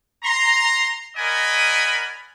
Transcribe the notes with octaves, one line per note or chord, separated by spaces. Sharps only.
A#5 C6
A#4 D5 D#5 F#5 G#5 B5